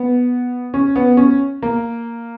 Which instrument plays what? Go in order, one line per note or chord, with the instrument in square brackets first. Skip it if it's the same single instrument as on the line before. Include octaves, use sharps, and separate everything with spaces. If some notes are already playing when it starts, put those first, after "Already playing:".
Already playing: [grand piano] B3
C#4
B3
C#4
A#3